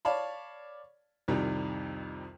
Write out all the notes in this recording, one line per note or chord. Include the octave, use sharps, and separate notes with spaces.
C#5 D5 F5 A5 B5
C2 F2 C3 D#3 G3